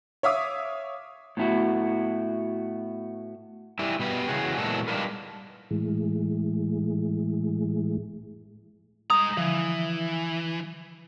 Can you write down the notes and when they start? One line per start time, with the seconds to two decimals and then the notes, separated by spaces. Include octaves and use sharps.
0.23 C#5 E5 F5 D6 D#6
1.37 A2 B3 E4 F#4
3.79 G3 E4 G4 E5 G#5
3.99 B2 G3 B4
4.28 C#3 E3 F#4 G#4
4.57 A#2 E3 F#3 G#3 B3 A4
4.88 G3 D4 D#4 F4 A#4 B4
5.71 A2 E3 G#3
9.10 G#3 A#5 D#6
9.37 D3 E3 F3